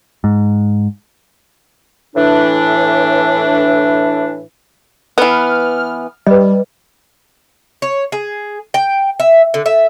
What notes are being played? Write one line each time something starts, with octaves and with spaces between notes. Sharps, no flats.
G#2
A2 E3 D4
E3 B3 F6
G3 B4 D#5
C#5
G#4
G5
E5
D3
E5